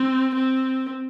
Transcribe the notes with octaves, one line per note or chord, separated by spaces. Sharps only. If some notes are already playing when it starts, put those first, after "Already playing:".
Already playing: C4
C4